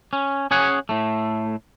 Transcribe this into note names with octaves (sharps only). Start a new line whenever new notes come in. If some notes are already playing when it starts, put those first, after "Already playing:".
C#4
C#4 G#4 C#5 F#5
A2 A3